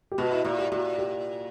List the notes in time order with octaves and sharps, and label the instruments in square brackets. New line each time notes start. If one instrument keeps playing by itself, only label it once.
[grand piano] G4
[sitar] B2 [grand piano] F#4
[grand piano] E4
[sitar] A#2 [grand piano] F#4
[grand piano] G4
[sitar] A#2 [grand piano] F#4
[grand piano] G4